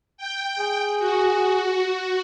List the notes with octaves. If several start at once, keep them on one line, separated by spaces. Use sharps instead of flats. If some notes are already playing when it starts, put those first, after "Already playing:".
G5
G#4
F#4